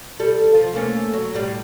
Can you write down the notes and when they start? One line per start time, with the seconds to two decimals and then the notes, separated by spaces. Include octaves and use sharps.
0.20 G3 A4
0.54 F3
0.73 A3 A#3 C#4
1.14 F#3
1.34 A2 G3